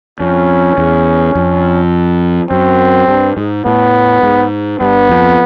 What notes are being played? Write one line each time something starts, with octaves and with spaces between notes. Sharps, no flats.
F2 C#4
E2
F2
F#2 C4
G2
G#2
A2 B3
G#2
G2 B3
F2